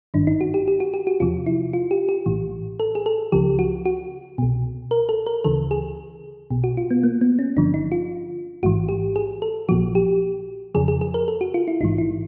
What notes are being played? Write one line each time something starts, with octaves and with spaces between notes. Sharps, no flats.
G#1 G2 D#3 D4
D#4
F#4
G4
G4
F#4
G4
F#4
E2 C3 F3 F4
E4
F4
G4
G4
A#1 A2 E3
A4
G#4
A4
C#2 C#3 F3 G4
F#4
F#4
C2 B2
A#4
A4
A#4
D2 C#3 E3 A4
G#4
B1 B2
F#4
F4
B3
A#3
B3
C#4
G1 G2 D3 F3 D4
D#4
F4
A1 G#2 E3 F#4
G4
G#4
A4
A#1 A#2 F3 F#4
G4
F2 C#3 F3 G#4
G#4
G#4
A#4
A4
F#4
F4
E4
A#1 G#2 E3 D#4
E4